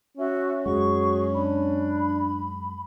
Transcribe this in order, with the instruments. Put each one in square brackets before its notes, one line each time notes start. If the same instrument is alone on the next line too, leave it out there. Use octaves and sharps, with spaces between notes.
[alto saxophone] C#4 [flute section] F#4 E5
[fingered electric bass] F#2 G#3 [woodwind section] F#4 [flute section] G#4 C#6
[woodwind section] D4 [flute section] B5